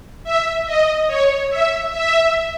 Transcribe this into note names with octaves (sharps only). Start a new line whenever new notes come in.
E5
D#5
C#5
E5
E5